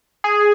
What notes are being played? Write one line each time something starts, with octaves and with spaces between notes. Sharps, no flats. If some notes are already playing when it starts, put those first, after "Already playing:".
G#4